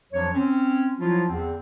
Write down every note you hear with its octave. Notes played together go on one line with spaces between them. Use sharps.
F2 F3 F#3 D4 C#5
C4 C#4
F3 F#3 E4 F4
E2 D3 C4